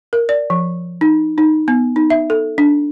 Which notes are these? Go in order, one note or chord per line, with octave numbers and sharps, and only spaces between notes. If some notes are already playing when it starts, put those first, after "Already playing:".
A#4
D5
F3
D#4
D#4
B3
D#4
E5
A4
D4